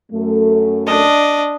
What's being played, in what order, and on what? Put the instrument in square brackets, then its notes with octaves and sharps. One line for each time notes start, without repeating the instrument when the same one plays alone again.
[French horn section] F#2 A3
[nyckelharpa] D4 D#5